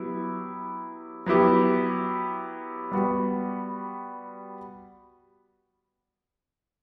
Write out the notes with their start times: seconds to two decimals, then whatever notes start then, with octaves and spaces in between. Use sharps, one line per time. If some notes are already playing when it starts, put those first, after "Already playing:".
Already playing: F#3 B3 E4 G4
1.26 F#3 B3 E4 G4
2.92 G3 B3 F#4